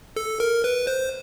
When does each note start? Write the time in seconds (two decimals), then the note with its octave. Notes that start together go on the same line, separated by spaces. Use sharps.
0.16 A4
0.40 A#4
0.64 B4
0.87 C5